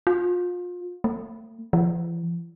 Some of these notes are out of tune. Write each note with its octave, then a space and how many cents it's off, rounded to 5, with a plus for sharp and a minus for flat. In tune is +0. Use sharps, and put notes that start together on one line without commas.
F4 +30
A3 +40
E3 +45